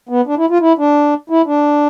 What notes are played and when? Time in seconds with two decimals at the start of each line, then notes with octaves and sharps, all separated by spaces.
0.09 B3
0.27 D4
0.38 E4
0.50 F4
0.61 E4
0.78 D4
1.30 E4
1.46 D4